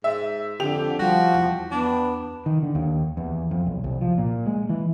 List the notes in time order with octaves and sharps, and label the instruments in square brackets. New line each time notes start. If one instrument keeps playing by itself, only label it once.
[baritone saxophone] G#2 [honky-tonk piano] E5
[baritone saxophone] F2 [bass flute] D3 [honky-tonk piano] G4 F7
[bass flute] F3 [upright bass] G3 [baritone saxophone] F#4
[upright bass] E2
[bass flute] B3 [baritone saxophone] D4
[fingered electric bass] D#3
D3
D#2
E2
F2
B1
C2
F3
A#2
G#3
E3